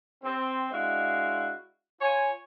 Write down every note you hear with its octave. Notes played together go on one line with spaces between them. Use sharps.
C4
G#3 D4 E4 F#4 D#5 F5
F4 C#5 G#5